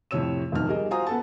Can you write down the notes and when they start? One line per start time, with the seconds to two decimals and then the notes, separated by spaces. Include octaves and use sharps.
0.11 F2 A2 C3 C#5 E6 E7
0.52 E1 F2 G#2 D#3 F6
0.68 G3 G#4 A#4 D#5
0.91 F4 F#4 C5 G#5 A#5 D#6
1.07 B3 A4 A5